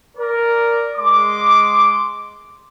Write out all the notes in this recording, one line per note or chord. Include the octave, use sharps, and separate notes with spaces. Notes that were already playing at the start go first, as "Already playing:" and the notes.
A#4 D5
G#3 C6 D6